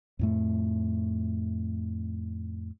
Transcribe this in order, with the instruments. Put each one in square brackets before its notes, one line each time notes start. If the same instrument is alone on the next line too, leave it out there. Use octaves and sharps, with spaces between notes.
[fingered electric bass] F2 A2 A3